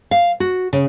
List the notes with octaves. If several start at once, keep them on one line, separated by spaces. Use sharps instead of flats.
F5
F#4
C#3